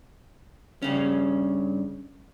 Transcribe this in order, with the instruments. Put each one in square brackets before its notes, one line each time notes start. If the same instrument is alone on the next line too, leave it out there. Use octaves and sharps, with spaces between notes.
[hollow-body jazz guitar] G2 C#3 C#4